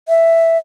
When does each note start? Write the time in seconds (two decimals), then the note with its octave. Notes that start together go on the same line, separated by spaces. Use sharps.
0.08 E5